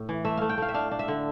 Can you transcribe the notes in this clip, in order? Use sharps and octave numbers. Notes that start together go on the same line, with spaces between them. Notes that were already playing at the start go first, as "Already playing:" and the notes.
Already playing: A2
E3
A3 E5
A3 F5
G5
A3 F5
E5
D4 F5
D4
E5
D3